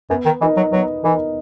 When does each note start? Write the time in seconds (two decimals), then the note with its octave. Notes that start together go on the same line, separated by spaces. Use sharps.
0.10 F#2 B3
0.25 D#3
0.41 E3 D#4 A#4 D#5
0.57 F#3
0.72 F#3 B3
1.03 E3 D#4 A#4 D#5